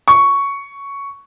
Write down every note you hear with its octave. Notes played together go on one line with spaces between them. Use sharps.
C#6